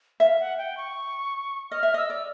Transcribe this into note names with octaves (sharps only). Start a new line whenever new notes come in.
E5 F5
F#5
G5
C#6
D#5 F6
E5
D#5 E6
D5